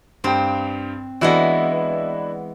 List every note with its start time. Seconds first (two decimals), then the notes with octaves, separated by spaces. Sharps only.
0.24 G2 C4 G5
1.21 E3 G#3 B3 D4 E4 F#4